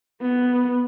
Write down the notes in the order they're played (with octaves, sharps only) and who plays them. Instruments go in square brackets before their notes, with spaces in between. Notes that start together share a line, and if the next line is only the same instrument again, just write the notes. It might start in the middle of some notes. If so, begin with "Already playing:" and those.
[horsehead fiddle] B3